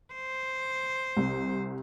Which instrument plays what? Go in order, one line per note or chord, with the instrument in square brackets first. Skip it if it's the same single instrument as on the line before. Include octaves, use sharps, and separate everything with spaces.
[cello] C5
[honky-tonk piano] C2